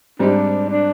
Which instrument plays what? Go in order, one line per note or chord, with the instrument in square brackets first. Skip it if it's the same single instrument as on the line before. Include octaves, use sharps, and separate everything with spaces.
[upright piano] G#2 G3 C4 D#4 G4 [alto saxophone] D4
[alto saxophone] D4